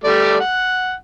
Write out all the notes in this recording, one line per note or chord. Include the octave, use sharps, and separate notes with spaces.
G3 A3 D5
F#5